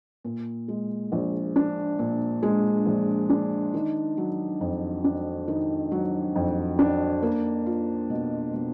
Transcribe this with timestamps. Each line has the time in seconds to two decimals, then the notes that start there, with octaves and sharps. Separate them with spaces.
0.24 A#2
0.68 G#3
1.12 A#1
1.56 D4
1.99 A#2
2.43 G#3
2.86 A#1
3.30 D4
3.74 D#3
4.17 F#3
4.61 F2
5.04 D4
5.48 D#3
5.92 F#3
6.36 F2
6.79 D4
7.23 A#3
7.66 F4
8.10 B2
8.54 B2